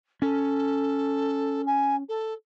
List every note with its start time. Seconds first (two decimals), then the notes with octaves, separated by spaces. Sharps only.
0.22 C#4 A4
1.66 G#5
2.08 A4